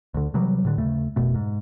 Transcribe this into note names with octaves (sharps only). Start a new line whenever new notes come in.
D2 D3
C3 E3 F#3 G3
A2 D3
D#2 C#3 A3
F1 B2 A3
G#2